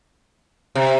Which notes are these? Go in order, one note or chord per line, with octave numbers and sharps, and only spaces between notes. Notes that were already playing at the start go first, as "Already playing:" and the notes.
C3